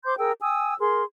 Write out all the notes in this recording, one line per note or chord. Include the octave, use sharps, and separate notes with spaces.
C5 C6 D6 G6
G#4 A#4 G5 E6
G5 G#5 D#6 E6
G#4 A#4 C6